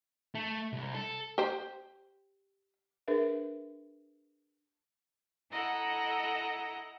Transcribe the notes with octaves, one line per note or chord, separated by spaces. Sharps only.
A3
C2
A4
G4 C5
D4 G#4 A#4 B4 E5
E4 A4 D#5 F#5 A#5